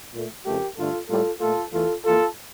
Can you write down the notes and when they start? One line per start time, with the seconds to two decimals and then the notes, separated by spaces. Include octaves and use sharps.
0.13 A#2 A3
0.45 F2 C#3 F3 A3 G4 A#4
0.76 G2 D3 A3 F4 A4
1.09 A2 G3 A#3 F4 A4
1.40 A#2 A3 F4 A4
1.73 E2 E3 A3 F4 A4
2.04 F2 E3 A#3 F4 A4